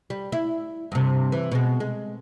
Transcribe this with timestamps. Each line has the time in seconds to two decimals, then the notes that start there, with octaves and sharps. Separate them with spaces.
0.10 G3
0.32 E4
0.92 G2 C3
1.32 E3
1.52 B2 G#3
1.80 G#3